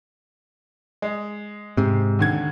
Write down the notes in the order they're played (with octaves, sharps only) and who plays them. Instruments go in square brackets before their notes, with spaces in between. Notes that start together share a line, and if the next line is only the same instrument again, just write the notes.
[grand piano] G#3
[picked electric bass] G#2 C3
[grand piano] D#2 D3 G#6